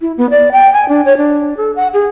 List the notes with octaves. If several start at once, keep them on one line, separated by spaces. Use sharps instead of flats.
E4
B3
D5
G5
G#5
D4
C#5
D4
A4
F#5
G#4